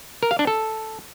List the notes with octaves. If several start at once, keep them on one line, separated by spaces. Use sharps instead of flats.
A#4
F5
D4
A4